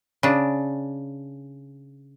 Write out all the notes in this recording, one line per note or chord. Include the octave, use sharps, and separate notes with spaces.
C#3 D4